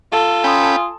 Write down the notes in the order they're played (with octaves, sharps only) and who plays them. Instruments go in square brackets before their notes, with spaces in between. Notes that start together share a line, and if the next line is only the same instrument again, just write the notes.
[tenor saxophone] F4 [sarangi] A4
[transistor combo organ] C#4 G5 B5 [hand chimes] G#5 C6 D#6